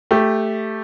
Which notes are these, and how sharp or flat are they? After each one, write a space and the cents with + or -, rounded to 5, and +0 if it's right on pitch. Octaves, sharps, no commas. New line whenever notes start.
A3 +0 G4 +0